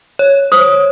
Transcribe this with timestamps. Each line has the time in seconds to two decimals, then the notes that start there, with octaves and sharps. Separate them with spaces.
0.19 C#5
0.52 C5 D#6